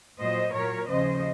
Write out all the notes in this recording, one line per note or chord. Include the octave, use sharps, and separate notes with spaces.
A#2 F#3 C5 D#5
A#2 F#3 A#4 C#5
D#2 C#3 F3 C5 D#5